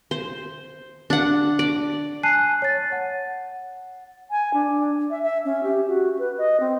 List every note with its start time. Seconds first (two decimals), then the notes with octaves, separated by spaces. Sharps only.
0.11 C5
1.10 D4 F#5
1.59 D5
2.23 G#5 A5 F#6 C7 D#7
2.62 C#5 A6
2.92 F#5
4.31 G#5
4.54 D4
5.10 E5
5.22 E5
5.45 C#4
5.63 G4
5.88 F#4
6.19 B4
6.38 D#5
6.60 C4